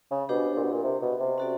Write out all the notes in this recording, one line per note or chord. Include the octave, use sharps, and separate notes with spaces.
C#3
B2 D4 G4 C5
A#2
B2
A#2
C3
B2
C3
C#4 F#4 A4 D5